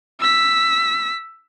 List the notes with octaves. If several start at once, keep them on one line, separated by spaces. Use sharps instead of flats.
E6 B6